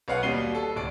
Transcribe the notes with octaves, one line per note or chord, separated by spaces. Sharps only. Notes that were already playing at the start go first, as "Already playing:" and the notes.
B1 B3 F5 F#5
D#2 B2 G3 C7 D#7 G7
A4
D1 D5 D7